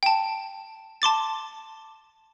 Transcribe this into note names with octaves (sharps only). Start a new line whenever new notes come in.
G5 A5
A5 C6 D6 A6